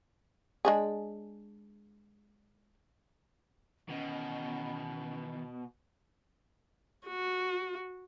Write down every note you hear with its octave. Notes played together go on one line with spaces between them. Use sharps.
G#3 D4 G#4
B2 D#3 E3 C#4 D#5
F#4